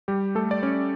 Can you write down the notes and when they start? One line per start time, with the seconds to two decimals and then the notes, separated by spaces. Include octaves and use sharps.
0.08 G3 G4
0.35 A3 A4
0.51 D5
0.63 C#4 C#5